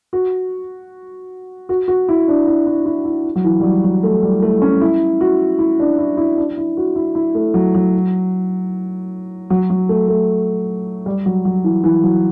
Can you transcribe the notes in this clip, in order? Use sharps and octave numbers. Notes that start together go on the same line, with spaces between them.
F#4
F#4
F#4
E4
D4
E4
E4
E4
E4
F#3
E3
G3
F#3
F#3
A3
G3
A3
C#4
E4
F#4
E4
D4
E4
E4
D4
E4
F#4
E4
E4
A3
F#3
F#3
F#3
F#3
A3
A3
G3
F#3
F#3
E3
E3
F#3